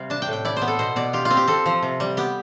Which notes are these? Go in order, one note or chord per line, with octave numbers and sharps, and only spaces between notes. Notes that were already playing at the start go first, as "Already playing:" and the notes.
Already playing: C3 G3 F5
D4 A5
G5
A2
G5
E4 D5
C5
B3
A4
B2 C5
B2 D5
F4 G4
F4
C4
G4
C4 A4
F3
C3
G3
B3 G4